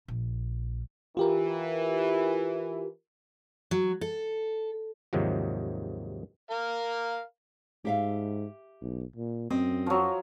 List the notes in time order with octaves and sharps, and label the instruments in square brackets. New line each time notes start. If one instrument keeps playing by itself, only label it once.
[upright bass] A#1
[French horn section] E3 [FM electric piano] F4 G4 A#4
[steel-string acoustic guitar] F#3
A4
[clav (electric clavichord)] D#2 G#2 C3 D#3 F3 F#3
[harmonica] A#4 F5
[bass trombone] G#2 [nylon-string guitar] G4 E5 F5
[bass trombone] B1
A#2
[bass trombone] F#2 [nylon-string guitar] C4 [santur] D#5
[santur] F3 F#3